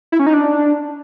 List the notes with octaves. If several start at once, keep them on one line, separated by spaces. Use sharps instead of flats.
E4
C#4
D#4
D4